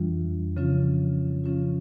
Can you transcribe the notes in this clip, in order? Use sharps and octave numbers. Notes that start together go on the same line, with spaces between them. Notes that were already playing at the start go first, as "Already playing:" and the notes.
Already playing: F2 E3 G3 D4 F4
C#3 F3 C#4 F4
C#3 F3 C#4 F4